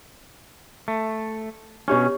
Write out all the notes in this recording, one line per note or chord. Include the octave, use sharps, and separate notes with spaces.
A3
B2 C#4 D4 G4 C#5